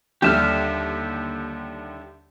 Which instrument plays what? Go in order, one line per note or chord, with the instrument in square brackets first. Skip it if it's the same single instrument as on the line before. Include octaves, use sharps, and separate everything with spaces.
[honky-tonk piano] D#2 D3 G3 [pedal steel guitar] G4 E5 F6